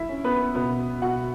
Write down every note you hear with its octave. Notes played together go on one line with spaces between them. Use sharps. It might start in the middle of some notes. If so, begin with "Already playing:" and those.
Already playing: F#3 E4 E5
C#4
B3 B4
B2 B3 B4
B2 F#4 F#5